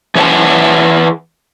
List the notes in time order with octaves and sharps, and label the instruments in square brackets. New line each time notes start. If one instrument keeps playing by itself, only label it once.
[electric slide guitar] E3 G#4 C#5 E5 F#5 A5